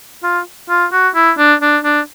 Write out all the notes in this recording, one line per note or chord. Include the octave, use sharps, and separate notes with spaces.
F4
F4
F#4
E4
D4
D4
D4